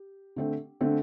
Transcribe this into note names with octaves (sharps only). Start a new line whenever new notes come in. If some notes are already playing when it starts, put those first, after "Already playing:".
Already playing: G4
D3 A3 C4
D3 A3 C4